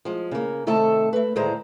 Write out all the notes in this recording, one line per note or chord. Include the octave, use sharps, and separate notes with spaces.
F3 G#3
C#3 A#3
C3 D#3 A3 A4 E5 A5
A3 B4
D2 A2 D#3 G#3 C5 A#5